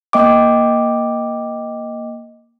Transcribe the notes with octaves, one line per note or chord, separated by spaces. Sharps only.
A#3 D#5 G5 D6